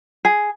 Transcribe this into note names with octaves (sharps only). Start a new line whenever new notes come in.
G#4